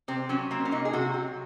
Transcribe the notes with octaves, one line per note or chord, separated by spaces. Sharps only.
C3 C4
F#3 C#4
A#3 C4
C#4
C3 D#4
G#4
C3 F#4
F#3